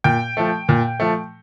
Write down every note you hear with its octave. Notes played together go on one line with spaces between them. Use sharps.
A#2 G5
F3 A3
A#2
F3 A3